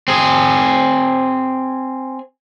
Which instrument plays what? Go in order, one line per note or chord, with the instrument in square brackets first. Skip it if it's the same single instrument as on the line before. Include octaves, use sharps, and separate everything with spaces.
[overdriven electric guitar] C4 G#4